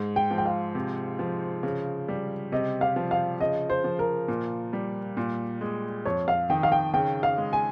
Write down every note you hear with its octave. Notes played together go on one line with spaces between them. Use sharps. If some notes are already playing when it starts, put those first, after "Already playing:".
Already playing: G#2
G5
F3
G5
F5
C3
F3
C#3
G3
C3 D#5
F5
F3
F5
C#3 D#5
C5
F3
A#4
A#2
G3
A#2
G#3
F2 C#5
F5
D#3 G5
F5
G5
C#3 G5
F5
G#3
G#5